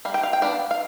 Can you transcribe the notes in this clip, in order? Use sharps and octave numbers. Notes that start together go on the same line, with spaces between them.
G3 F5
G5
F5
G5
B3 D4 D5 F5
F5